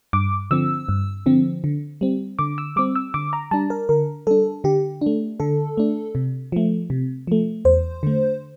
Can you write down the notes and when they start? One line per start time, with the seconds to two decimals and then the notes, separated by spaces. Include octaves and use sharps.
0.13 G2 D6
0.51 D3 F3 C4 E6
0.89 G2
1.26 D3 F3 C4
1.64 D3
2.01 G3 C4
2.39 D3 D6
2.58 E6
2.76 G3 C4 D6
2.95 E6
3.14 D3 D6
3.33 A#5
3.51 G3 D4 A5
3.70 A#4
3.89 D3 A#4
4.27 G3 D4 A4
4.64 D3 G4
5.01 A3 D4
5.40 D3 A4
5.77 A3 D4
6.15 C3
6.52 F3 A3
6.90 C3
7.27 F3 A3
7.65 E2 C5
8.03 D3 A3